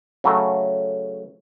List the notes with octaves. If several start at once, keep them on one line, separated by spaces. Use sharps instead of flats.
C#3 F#3 A3